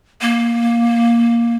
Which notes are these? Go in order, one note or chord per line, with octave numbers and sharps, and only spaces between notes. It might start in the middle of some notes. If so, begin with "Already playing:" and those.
A#3